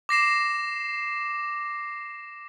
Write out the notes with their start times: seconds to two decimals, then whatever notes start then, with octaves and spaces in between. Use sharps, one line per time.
0.09 D6 A#6 C7 E7